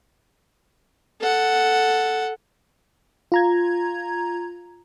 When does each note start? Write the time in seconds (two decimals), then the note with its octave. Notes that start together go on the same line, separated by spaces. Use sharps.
1.22 A4 F#5
3.32 F4 A#5 G#6